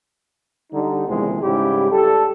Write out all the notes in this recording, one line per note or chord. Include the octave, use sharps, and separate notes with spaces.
D3 G3 D#4
A#1 E2 C3 D#3 G#3
G#2 C#3 G3 E4 G4
G3 A4